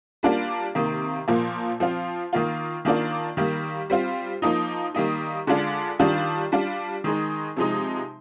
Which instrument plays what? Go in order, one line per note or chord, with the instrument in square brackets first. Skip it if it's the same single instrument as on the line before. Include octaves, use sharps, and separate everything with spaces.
[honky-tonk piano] G3 A#3 D4 F4
C3 D#3 A#3
A#2 F3 A#3
F3 C4 F4
D#3 A#3 F4
D#3 A#3 D4 F4
D#3 G3 A#3
G3 C4 F4
F3 A#3 D#4
D#3 G3 A#3 D#4
D3 G#3 D4 F4
D#3 G3 D4 F4
G3 D4 F4
D#3 G#3 D#4
C3 F3 G#3 D#4